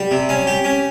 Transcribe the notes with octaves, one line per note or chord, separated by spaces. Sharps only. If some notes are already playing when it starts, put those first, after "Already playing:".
Already playing: G3
C3
C#4
G4
C#4